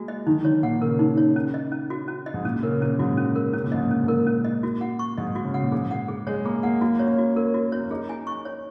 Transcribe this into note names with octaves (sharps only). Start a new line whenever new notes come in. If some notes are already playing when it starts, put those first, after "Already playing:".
Already playing: G#3 A#3 F#4
D#5
D#3 D#4
D#3 C#5
A#2 F#5
C#3 A#4
D#4
C#5
C#4
D#5
C#4
F#4
C#4
D#5
G#2
A#2 C#4
C#3 A#4
A#2 C#4
A#2
G#2 F#4
C#4
A#4
C#3 C#4
A#2
G#2 D#5
A#2
C#4
G#2
A#2 A#4
C#4
D#5
F#4
F#5
C#6
G#2 D#5
F#4
C#3
F#5
A#2
G#2 G#4
F#5
G#4
G#3 C#5
A#3 G#4
A#3 F#5
A#3 F#4
C#4 C#5
A#3
F#4
C#4 A#4
F#4
A#3 C#5
C#4
D#4 G#4
G#5
C#6
C#5